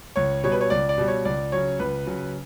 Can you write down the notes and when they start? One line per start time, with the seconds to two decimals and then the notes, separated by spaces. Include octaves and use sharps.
0.16 C#2 C#5
0.44 B2 G3 C#5
0.52 B4
0.61 C#5
0.70 C#2 D5
0.89 D5
0.98 B2 G3
1.08 C#5
1.25 C#2 D5
1.52 C#3 F#3 C#5
1.80 C#2 B4
2.06 C#3 F#3